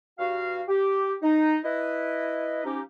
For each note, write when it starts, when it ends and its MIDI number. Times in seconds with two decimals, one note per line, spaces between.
0.19 0.63 43
0.19 0.63 66
0.19 0.63 77
0.68 1.14 67
1.22 1.57 63
1.64 2.61 64
1.64 2.61 71
1.64 2.61 75
2.64 2.80 53
2.64 2.80 61
2.64 2.80 63
2.64 2.80 67